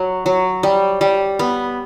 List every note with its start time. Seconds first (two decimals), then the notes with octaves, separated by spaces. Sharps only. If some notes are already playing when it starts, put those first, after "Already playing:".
Already playing: F#3
0.26 F#3
0.63 G3
1.01 G3
1.39 B3